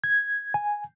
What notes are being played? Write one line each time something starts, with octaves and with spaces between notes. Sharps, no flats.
G#6
G#5